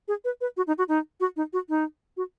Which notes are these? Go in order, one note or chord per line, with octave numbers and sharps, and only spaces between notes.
G#4
B4
B4
F#4
D#4
F#4
D#4
F#4
D#4
F#4
D#4
F#4